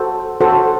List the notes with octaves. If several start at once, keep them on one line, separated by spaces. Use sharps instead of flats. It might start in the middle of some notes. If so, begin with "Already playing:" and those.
Already playing: F#4 A4 C5
F#4 A4 C5